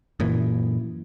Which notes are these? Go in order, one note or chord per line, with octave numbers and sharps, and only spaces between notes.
F#2 A#2 E3